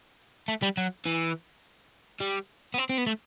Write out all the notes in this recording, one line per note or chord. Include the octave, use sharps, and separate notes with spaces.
A3
G3
F#3
E3
G3
B3
C4
C4
B3
A3